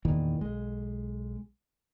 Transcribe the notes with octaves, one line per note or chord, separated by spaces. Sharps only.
E2 A#2 D#3 E3
B1 G#3